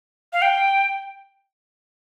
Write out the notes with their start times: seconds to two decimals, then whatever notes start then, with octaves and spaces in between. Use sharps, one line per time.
0.33 F5
0.42 G5